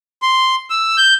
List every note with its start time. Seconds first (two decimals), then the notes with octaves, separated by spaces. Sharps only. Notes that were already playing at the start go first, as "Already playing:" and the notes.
0.22 C6
0.70 E6
0.98 G6